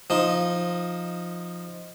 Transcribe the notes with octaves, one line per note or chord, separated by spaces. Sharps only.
F3 D#4